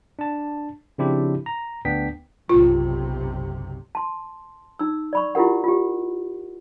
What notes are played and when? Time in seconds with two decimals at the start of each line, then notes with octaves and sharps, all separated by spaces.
0.19 D4 A5
0.98 C#3 F3 C4 D4 E4 G4
1.46 A#5
1.85 D2 B3 D4 G5 B6
2.49 F#1 B1 C3 F4
3.95 A5 C6
4.79 D#4 E6
5.13 D5 B5 C#6
5.35 E4 F4 G4 A#4 F#5
5.64 F4 G4